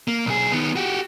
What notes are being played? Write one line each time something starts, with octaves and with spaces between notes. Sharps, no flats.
A#3
B1 G#4
D#3 B3
F#4 G4